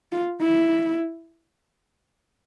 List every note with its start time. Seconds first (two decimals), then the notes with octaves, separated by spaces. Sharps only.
0.12 F4
0.41 E4